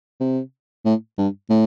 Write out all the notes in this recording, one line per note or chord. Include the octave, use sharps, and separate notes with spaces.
C3
A2
G2
A2